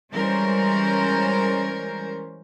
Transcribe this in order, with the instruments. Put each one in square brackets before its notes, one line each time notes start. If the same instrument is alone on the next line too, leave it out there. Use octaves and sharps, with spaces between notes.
[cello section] E3 G3 G#3 C#4 A#4 C5